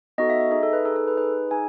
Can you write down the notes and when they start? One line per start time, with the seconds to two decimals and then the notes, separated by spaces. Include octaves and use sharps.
0.18 B3 D#4 F#4 A4 D#5
0.30 E5
0.40 D#5
0.51 D#4 G#4 E5
0.63 A4
0.73 B4
0.85 D#4 G#4 A4
0.96 A4
1.07 B4
1.18 D#4 G#4 B4
1.51 D#4 G#4 G#5